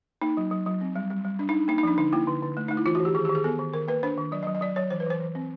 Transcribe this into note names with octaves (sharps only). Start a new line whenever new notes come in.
A#3 D#4
F#3
F#3
F#3
C4
G3
G3
G3
D4
D#4
D4
A#3 D#4
D#4
F3 D4
D3 D#4
A#3 E4
D3
D3
A3
A3 D#4
E4
E3 F4
F#4
E3
G4
D#3 G#4
G4
D#3
G#4
B3 A4
D#3
D#3 A#4
A#3 B4
D4 C5
D#3
F#3 D5
D#5
F#3
D#5
F#3 D5
F#3 C#5
E3 C5
B4
E3 C5
E3
C4